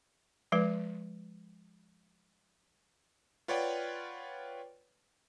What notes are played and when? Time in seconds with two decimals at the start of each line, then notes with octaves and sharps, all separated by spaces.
0.52 F3 G#3 B4
3.48 F4 B4 C#5 D5 F#5 G5